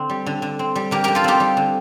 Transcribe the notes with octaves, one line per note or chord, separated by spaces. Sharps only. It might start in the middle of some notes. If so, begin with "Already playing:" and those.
Already playing: D3 C4
G3
D3
D3
C4
G3
D3 G4 A#4
D3 G4 A#4
F4 A4
C4 D#4 G4
G3
D3